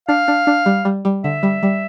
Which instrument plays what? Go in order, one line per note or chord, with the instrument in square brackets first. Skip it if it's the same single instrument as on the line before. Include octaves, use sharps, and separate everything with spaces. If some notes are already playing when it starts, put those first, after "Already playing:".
[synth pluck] D4 [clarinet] F5
[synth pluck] D4
D4
G3
G3
G3
[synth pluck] D3 [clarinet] E5
[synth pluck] G3
G3